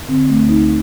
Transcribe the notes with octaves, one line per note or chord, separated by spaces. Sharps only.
D3 C4
A3
D2
D#4